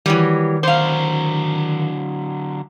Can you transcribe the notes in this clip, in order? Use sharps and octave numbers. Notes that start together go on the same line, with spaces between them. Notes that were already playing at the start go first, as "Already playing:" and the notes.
D#3 E3 F#3 G3
D3 F#3 C5 F5